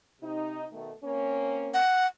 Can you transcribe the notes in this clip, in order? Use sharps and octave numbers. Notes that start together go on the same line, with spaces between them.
C3 D#4
B2 D#3 A3
A#3 C4 C#4
F#5